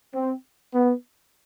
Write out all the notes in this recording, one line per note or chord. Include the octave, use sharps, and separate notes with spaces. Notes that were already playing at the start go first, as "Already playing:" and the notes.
C4
B3